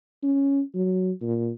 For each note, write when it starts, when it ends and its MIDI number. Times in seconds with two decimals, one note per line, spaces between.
0.23 0.61 61
0.75 1.12 54
1.22 1.50 46